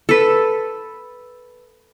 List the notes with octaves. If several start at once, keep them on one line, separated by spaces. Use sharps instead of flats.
A4 B4